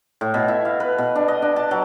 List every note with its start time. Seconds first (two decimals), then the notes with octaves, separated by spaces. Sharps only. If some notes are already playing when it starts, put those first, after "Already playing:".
0.21 A2
0.34 B2
0.48 E4
0.65 F5
0.80 B4
0.98 B2
1.15 D4
1.28 D#5
1.42 D4
1.56 A5
1.71 F#3